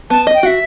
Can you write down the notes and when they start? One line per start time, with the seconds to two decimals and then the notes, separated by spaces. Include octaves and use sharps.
0.10 B3 A5
0.27 D#5
0.35 G5
0.43 F#4 E5